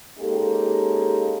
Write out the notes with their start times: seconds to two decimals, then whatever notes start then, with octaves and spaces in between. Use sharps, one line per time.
0.19 G#3 A#3 C#4 D#4 G4 A4